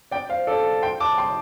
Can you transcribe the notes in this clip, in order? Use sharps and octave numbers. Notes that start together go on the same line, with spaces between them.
D5 G5
C5 F5
A4 D5
G5 C6
A5 D6
G5 C6